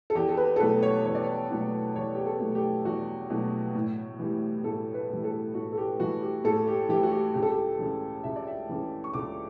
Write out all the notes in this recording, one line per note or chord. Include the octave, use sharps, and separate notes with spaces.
A4
E2 G4
A4
B4
A4
B2 F#3 A3 B4
C#5
E2 C#5
D5
C#5
B2 F#3 A3
E2 C#5
G4
A4
B2 F#3 A3
G4
E2 F#4
B2 F#3 A3
A2
E3 G3
A2 A4
B4
E3 G3
A4
A2 F#4
A4
G4
E3 G3 F#4
G4
A2 A4
G4
E3 G3 G4
F#4
G4
C#2 G4
A4
G4
C#3 E3
C#2 E5
D5
E5
C#3 E3
C#6
C#2 D6